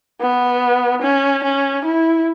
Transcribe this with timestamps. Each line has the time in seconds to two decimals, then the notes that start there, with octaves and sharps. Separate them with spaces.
0.21 B3
1.02 C#4
1.44 C#4
1.85 E4